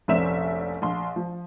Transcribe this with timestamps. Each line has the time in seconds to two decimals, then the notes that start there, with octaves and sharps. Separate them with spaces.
0.08 F1 A#1 C4 C#4 E5 E7
0.82 A#1 C6
1.16 F3